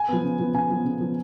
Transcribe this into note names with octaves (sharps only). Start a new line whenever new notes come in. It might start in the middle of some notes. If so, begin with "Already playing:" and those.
Already playing: G#5
F3 B3
C#3
F3 B3
C#3 G#5
F3 B3
C#3
F3 B3